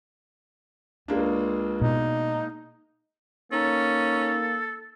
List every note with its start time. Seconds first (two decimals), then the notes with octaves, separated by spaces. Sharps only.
1.08 C#2 G#3 A#3 D4
1.81 B2 D#4
3.52 A#3 C#4 D#4 A4